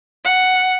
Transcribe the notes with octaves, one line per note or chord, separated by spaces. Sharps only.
F#5